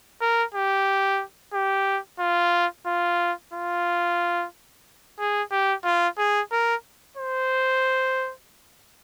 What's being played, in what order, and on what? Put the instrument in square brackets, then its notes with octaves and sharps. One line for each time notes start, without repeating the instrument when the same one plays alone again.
[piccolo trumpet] A#4
G4
G4
F4
F4
F4
G#4
G4
F4
G#4
A#4
C5